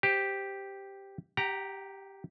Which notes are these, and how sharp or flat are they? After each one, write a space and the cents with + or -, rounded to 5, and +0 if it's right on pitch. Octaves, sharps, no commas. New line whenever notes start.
G4 +0 C5 -10
G4 +0 F#5 +45 A#5 +0